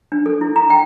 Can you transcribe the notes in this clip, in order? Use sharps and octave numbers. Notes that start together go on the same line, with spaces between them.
D4
A4
E4
A#5
G5